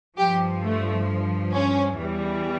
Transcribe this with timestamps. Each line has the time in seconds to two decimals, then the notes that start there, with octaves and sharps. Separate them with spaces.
0.18 G2 F3 G4
0.63 A3
1.53 C#4
1.98 E2 E3 G3